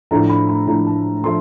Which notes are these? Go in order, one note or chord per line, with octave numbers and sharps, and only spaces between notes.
A2 F3 A3 D4 A#5
B5
B5
A2 F3 A3 D4 A#5
A5
F3 A3 D4 C6